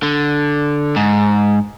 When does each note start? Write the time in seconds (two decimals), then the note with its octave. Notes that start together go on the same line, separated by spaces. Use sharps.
0.03 D3
0.96 G#2